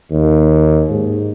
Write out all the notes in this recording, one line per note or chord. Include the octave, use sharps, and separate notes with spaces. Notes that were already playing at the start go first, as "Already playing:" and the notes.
D#2
G#2